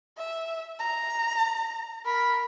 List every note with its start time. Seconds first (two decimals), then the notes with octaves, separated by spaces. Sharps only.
0.18 E5
0.80 A#5
2.06 A#4 B5